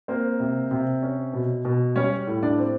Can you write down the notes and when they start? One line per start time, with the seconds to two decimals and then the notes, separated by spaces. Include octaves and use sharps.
0.08 A#3 C4 C5
0.40 C3
0.71 C3
1.02 C#4
1.33 B2
1.65 B2
1.96 G3 C#4 C#5
2.27 A2
2.43 D4 D5
2.59 C4